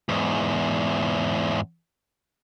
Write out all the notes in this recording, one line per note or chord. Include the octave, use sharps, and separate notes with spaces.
E2 G#2